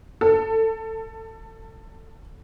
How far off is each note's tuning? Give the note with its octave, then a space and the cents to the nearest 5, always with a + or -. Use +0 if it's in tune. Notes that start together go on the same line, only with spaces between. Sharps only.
A4 +25